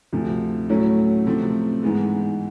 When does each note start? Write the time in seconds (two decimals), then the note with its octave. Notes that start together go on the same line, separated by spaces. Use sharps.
0.13 D2 C3 F3
0.69 A2 F#3 A3 C#4 E4
1.26 C3 F3 A3 C4
1.83 G#2 E3 G#3 B3